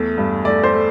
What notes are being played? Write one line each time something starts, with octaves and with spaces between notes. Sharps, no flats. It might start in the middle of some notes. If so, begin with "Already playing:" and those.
Already playing: E2 A3
G2
A3 D5
C5
A3